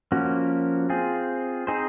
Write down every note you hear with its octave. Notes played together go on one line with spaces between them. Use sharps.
F3 A#3 C#4 F#4
C4 F4 G#4
C4 D#4 G#4 C5